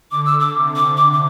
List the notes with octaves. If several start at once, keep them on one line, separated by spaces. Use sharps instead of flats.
D3 D6
E6
D6
C3
D6
D6
D6